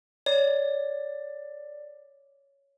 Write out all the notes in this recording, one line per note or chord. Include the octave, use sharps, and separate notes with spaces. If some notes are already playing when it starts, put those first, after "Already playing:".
C#5 D5